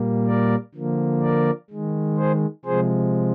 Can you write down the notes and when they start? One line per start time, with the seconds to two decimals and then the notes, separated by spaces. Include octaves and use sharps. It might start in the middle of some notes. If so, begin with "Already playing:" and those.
Already playing: A#2 G3 A#3
0.27 A#4 D5
0.75 D3 F3 A#3
1.22 A#4 D5
1.70 D#3 G#3
2.17 G#4 C5
2.65 C3 F3 G#3 G#4 C5